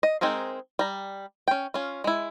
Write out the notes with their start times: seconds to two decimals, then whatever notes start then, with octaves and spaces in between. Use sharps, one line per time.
0.03 D#5
0.21 G#3 C4 D#4 G#4 A#4
0.79 G3 A#5
1.48 C#4 G5
1.74 C#4 F4
2.04 G#3 E4